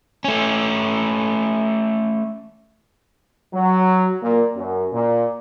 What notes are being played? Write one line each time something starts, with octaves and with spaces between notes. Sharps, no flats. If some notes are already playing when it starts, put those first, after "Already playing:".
A3 C#4
F#3
A#2
F#2
A#2